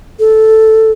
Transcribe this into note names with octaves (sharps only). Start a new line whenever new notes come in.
A4